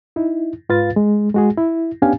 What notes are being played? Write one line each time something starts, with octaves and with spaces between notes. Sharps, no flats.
D#4 E4
G#2 F4 B4 F5 A6
G#3
G#3 F#4 G#4
E4
B3 C#4 D4 G4 F5 G#5